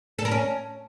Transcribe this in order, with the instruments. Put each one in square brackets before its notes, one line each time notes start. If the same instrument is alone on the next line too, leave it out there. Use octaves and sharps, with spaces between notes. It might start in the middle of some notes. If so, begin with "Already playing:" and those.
[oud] A4
A#4
C#4